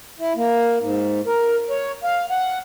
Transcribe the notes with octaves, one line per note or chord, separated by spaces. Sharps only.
E4
A#3
G#2
A#4
C#5
F5
F#5